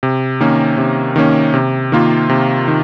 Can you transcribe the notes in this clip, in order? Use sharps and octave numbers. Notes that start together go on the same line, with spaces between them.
C3
D#3 A#3 C#4
C3
D#3 A#3 C#4
C3
D#3 A#3 F4
C3
D#3